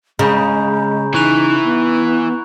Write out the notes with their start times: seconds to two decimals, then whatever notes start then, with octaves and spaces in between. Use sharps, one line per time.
0.19 C#3 G#3 A#5 B5 G6
1.14 E3 D#4 C#6 F#6 F7
1.64 B3